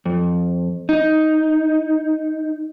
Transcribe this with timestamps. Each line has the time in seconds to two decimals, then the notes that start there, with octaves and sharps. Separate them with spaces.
0.06 F2
0.89 D#4